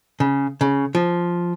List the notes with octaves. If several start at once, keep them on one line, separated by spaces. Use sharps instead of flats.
C#3
C#3
F3